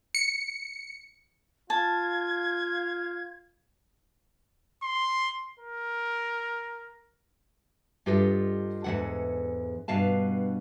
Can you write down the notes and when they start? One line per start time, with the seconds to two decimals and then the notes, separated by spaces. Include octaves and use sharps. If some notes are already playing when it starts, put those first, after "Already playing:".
0.15 C#7
1.70 F4 A5 G#6
4.83 C6
5.59 A#4
8.06 G2 F4 G4 A4 D#5
8.84 E2 G#2 E3 A4 F#5
9.88 G2 B2 F5 A5